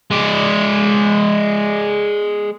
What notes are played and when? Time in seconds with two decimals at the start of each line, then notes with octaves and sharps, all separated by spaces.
0.11 G#3 D5